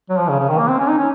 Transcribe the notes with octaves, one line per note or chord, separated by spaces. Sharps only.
F#3
F3
C#3
C#3
D#3
A#3
C4
C#4
D#4
C#4